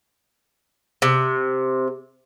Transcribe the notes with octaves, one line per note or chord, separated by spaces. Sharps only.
C3